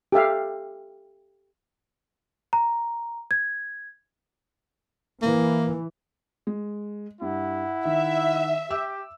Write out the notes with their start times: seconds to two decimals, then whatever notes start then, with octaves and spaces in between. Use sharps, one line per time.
0.12 G4 A4 E5 F5
2.53 A#5
3.31 G#6
5.22 E3 A#3
6.47 G#3
7.22 G2 E4 F#5
7.85 D#3 E5
8.71 G4 D6 E6